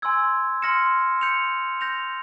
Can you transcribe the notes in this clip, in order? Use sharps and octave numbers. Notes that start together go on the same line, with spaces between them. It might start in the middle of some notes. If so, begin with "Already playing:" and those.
G#5 C6 E6 G#6
C6 F6 A#6 C#7 E7
G6 C#7 F7
G6 A#6 F7